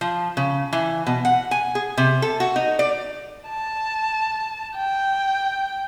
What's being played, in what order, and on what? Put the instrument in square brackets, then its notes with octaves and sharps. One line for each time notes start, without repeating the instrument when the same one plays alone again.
[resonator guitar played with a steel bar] F3
C#3
E3
B2
F#5
G#5
G#4
C3
A4
F#4
D#4
D5
[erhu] A5
G5